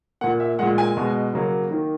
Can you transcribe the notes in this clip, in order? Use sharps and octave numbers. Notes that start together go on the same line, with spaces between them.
A#2 A#3 F#5
E5
A#2 G#3 F#5
G#5
B2 G#3
C#3 F#3 A#3
D#3 A#3